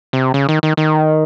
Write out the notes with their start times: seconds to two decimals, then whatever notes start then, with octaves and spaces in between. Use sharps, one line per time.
0.13 C3
0.34 C#3
0.49 D#3
0.63 D#3
0.77 D#3